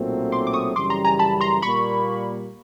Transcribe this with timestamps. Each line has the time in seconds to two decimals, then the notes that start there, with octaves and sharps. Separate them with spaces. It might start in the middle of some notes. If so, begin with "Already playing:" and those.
Already playing: B1 A#2 F#3 A3 C4
0.32 C6 D6
0.47 D6
0.53 C#6 D#6
0.76 F#2 C#3 E3 G3 C6 D6
0.90 A#5 C6
1.05 G#5 A#5
1.19 A5 B5
1.41 A#5 C6
1.62 A#2 G3 A#3 B5 C#6